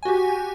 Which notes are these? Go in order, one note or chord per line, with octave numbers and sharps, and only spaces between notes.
F#4 G4 G#5